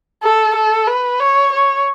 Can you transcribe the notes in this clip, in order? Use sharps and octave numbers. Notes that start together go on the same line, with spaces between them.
A4
A4
B4
C#5
C#5